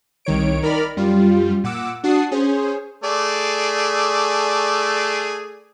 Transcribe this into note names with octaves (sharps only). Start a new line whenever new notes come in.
C2 D#3 C#5 D7
D#3 A#4 D5 B5 F6
F#2 G3 F4
A#2 F#5 D6 E6
D4 F#4 F#5 A5 D#6 C7
C#4 G#4 C5
A3 G#4 D5